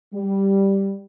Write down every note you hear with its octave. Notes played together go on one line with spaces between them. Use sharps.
G3